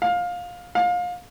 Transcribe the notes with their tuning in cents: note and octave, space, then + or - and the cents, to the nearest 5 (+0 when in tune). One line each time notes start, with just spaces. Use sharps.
F5 +20
F5 +30